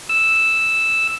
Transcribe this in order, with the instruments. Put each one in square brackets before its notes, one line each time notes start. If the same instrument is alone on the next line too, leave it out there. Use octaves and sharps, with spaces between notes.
[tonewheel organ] E6